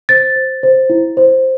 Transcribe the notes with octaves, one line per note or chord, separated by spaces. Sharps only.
C5 A6
C5
C5
E4
C5